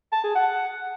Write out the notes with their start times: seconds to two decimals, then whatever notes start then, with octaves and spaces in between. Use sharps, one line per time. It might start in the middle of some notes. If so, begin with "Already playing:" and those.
0.12 A5
0.24 G#4
0.35 F#5